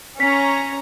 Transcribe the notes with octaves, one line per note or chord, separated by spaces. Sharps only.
C#4 A#5 B6